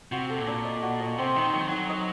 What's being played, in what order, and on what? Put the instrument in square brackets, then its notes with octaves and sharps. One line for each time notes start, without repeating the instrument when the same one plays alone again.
[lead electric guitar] C3 [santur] F#4
[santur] A4
[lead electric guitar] A#2
[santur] D4
D#5
F#4
D#5
[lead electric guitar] C3 [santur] C4
[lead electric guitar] D#3 [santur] D#4
[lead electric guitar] F#3 [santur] D#5
[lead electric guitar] D#3
[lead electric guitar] F#3 [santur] D#4
[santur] D#5